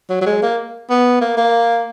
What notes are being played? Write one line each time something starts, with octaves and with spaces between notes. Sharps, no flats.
F#3
F#3
G#3
A#3
B3
A#3
A#3